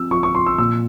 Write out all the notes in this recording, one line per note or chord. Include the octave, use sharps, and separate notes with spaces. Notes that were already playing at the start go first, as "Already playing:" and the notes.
Already playing: F3 C4 E6
F3 C#6
C#6
F3 C6
E6
A#2 E6